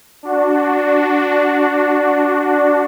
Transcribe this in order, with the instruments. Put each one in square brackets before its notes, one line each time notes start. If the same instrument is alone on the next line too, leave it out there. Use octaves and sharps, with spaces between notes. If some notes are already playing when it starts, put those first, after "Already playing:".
[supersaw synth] D4 F#4